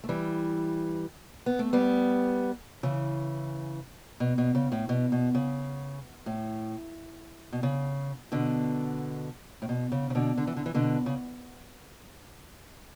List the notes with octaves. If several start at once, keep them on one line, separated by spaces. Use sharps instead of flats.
A3
E3 G3
B3
A3
G3 B3
C#3 E3
B2
B2
C#3
A2
B2
B2
C#3
A2
B2
C#3
B2 D3
A2
B2
C#3
C#3
B2 D3
D3
E3
D3
E3
B2 D3
C#3